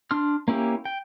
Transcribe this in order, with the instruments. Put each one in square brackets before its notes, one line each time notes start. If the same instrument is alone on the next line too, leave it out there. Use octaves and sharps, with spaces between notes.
[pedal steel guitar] D4 C6 F6
A#3 C#4 E4 G4
G5